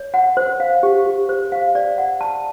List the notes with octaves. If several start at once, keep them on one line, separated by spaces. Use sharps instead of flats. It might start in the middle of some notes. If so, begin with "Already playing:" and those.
Already playing: C#5
F#5
C5
F5
G4
G4
C5
F5
D5
F#5
A5